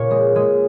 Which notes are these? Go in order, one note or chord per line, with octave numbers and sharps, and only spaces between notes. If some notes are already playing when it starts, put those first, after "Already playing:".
Already playing: A#2 C#5
G#3
G#3